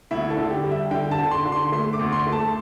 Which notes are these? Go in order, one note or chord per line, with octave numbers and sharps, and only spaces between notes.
D2 E4
A4
D3
G4
G3
E5
D3 G5
A5
D3
C6
D3
C6
A3 C6
D6
D2
C6
A3
A5